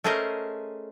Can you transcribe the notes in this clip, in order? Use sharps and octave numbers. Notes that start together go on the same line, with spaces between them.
A3 C#4 G#4 A#4 C5 D#5